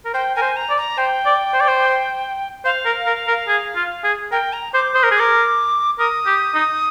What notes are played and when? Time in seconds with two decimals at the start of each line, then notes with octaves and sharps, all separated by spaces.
0.05 A#4
0.14 C5 G5
0.36 A#4 G#5
0.42 C5
0.56 A#5
0.70 D5
0.77 A#5
0.98 C5 G5
1.26 D5
1.54 C5
1.61 D5
1.68 C5
2.65 C5 F5
2.85 A#4
3.06 A#4
3.28 A#4
3.48 G#4
3.76 F4
4.04 G#4
4.32 A#4 G5
4.53 A#5
4.73 C5 D6
4.95 C5 D#6
5.03 A#4
5.11 G#4
5.15 A#4 D6
5.99 A#4 D#6
6.27 G4
6.55 D#4